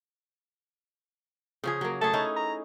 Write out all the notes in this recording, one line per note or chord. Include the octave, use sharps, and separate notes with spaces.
C#3 F3 G#4
F#3 A#3
A3 G#4 A5
C#4 D#4 E4
A#5